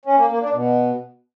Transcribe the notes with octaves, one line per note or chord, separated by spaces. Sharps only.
C#4
A#3
A#3
D4
B2